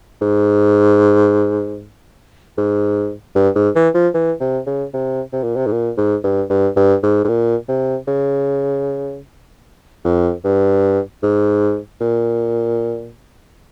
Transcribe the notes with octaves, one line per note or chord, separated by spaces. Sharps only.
G#2
G#2
G2
G#2
E3
F3
E3
C3
C#3
C3
C3
A#2
C3
G#2
A#2
G#2
G2
G2
G2
G#2
G#2
A#2
C3
C#3
F2
G2
G#2
A#2